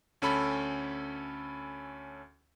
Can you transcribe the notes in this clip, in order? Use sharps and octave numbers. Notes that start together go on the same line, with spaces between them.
D2 C#4 A4 B5